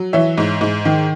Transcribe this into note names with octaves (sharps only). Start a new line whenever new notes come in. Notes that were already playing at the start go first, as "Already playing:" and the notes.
Already playing: F#3
E3 C#5 E5
G#2
G#2
D#3